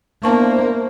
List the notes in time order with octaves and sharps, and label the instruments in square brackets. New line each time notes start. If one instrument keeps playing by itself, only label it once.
[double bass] A#3 [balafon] B3 A5 C#6 [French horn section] D4 E4 C5